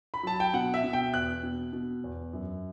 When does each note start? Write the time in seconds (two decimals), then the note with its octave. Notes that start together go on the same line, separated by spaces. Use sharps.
0.14 B5
0.23 F#3 A5
0.40 G5
0.54 B2 F#5
0.74 E5
0.84 B2
0.93 G5
1.14 E2 F#6
1.43 B2
1.73 B2
2.04 E2
2.33 F#2